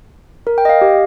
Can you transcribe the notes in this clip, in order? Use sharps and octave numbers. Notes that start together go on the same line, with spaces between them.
A#4
G5
D#5
F5
G4